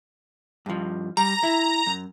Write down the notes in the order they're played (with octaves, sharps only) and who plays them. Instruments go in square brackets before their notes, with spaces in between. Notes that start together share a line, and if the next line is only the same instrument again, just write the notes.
[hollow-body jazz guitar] G2 F3
[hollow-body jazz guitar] G3 [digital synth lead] A#5
[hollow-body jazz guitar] E4
F#2